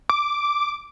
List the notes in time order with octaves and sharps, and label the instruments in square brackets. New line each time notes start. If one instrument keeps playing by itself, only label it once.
[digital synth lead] D6